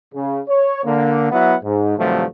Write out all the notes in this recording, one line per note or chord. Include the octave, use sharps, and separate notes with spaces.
C#3
C#5
D3 A#3
F#3 B3 E4 E5 F#5
G#2
G2 C3 D#3 F3 F#3 A3